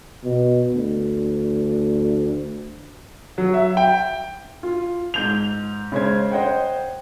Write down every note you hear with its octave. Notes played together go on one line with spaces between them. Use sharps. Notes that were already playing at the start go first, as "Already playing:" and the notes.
B2
D2
F#3
E5
G5
F4
G#2 G6 F7
C#3 G#3 C5 G#6
C5 D#5 F#5 G5